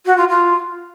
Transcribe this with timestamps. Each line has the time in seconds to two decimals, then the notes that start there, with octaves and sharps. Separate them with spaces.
0.06 F#4
0.17 F4
0.29 F4